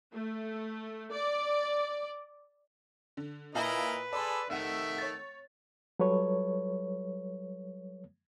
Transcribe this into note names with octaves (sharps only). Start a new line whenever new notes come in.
A3
D5
D3
A#2 E4 A#4 B4 D#5 F5 A5
G#4 A4 D5 B5 C6
F1 D#3 A3 E5 F#5
C#5 A6
F#3 G3 A4 B4 C#5